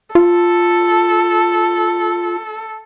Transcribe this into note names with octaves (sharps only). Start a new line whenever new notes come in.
F4 A4